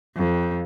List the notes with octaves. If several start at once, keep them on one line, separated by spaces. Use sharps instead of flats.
F2